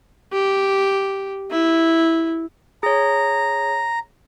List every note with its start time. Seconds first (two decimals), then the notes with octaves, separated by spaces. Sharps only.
0.33 G4
1.51 E4
2.83 G#4 C#5 A#5